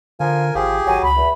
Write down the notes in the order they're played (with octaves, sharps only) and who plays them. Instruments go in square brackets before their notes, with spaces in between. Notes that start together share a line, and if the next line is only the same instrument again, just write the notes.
[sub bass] D3 [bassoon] F3 [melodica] A#4 G#5
[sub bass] G#1 [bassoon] F3 [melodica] G4 G#4
[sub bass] G#1 [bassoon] F#3 [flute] G#5
[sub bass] C#2 [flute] B5
[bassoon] E2